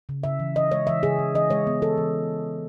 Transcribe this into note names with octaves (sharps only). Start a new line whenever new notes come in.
C#3
C#3 E5
E3
E3 D#5
G#3 C#5
E3 E5
C#3 G#4
E3
E3 D#5
G#3 C#5
B3
E3 A4
E3